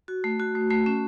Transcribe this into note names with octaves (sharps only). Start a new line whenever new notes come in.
F#4
A3
F#4
A3
A3
C#4